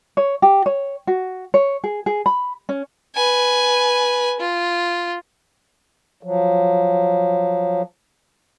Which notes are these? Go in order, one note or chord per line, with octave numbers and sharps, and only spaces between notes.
C#5
G4
C#5
F#4
C#5
G#4
G#4
B5
C#4
B4 G#5
F4
F3 F#3